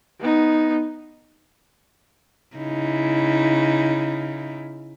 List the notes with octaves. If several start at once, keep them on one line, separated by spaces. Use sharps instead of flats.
B3 D#4
C#3 D#4 E4